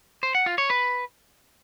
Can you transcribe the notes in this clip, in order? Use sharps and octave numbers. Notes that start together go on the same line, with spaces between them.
C5
F#5
F4
C#5
B4